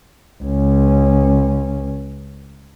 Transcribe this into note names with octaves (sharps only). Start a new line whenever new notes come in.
C#2 C#4